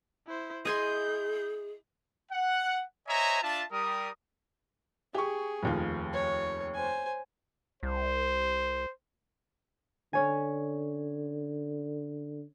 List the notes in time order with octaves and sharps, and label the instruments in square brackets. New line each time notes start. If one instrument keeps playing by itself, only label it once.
[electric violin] E4 C5
[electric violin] E4 G6 [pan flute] G#4 [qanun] D#5 G#5 C6
[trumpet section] F#5
C5 C#5 D#5 E5 G#5 A#5
D4 F4 E5 A5
G3 A#4 D#6
[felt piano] G4 C#6 [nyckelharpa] G#4
[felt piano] F1 D#2 F4
[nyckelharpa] C#5
C5 G#5
[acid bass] C2 [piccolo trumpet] C5
[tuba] D3 [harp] C#4 C#5 G#5